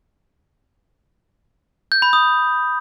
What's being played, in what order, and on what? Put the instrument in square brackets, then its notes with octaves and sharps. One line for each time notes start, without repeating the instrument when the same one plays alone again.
[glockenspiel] G6
B5
D#6